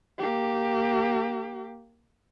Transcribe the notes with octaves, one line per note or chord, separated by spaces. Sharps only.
A#3 G4